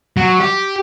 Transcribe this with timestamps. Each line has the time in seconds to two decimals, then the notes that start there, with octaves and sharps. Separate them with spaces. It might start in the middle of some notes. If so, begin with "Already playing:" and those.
0.17 F#3
0.40 G4